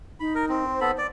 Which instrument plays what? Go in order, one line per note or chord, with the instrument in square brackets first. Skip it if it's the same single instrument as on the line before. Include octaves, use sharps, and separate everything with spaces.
[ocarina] D#4 [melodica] B5
[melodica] A#4
C4
[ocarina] C5
[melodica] B3 A4 B5
D5